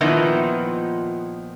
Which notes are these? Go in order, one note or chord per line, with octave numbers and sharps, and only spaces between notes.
A#2 D#3 F3 B3 D#4 E4